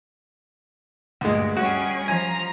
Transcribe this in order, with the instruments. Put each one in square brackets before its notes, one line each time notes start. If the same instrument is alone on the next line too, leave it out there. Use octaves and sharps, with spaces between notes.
[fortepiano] D2 G#3 [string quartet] G2 A#2
[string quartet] G3 C#4 G#4 [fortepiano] F#4
[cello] F3 [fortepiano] G#5 [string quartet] A#5